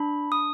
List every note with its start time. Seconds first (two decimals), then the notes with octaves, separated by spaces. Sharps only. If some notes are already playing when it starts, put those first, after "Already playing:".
Already playing: D4 B5
0.32 D4 D#6